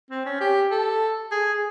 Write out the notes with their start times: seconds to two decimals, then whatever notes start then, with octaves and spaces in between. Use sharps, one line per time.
0.10 C4
0.25 C#4
0.41 G4
0.71 A4
1.31 G#4